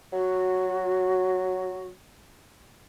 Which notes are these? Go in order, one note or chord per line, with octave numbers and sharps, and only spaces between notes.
F#3 F#4